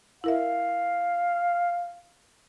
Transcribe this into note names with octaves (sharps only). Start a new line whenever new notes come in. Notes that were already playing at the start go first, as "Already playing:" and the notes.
E4 A#4 E5 F5